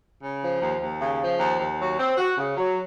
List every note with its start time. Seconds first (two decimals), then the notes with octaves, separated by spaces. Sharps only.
0.23 C#3
0.43 F3
0.62 D#2
0.82 D#2
1.00 C#3
1.21 F3
1.40 D#2
1.60 D#2
1.79 F#3
1.99 C4
2.17 F#4
2.37 C#3
2.57 F#3